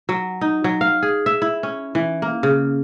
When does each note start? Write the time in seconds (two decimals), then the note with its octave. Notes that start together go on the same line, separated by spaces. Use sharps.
0.09 F#3
0.41 D#4
0.64 F#3
0.81 F5
1.03 G#4
1.26 E5
1.42 E4
1.63 C#4
1.95 E3
2.22 A#3
2.43 C#3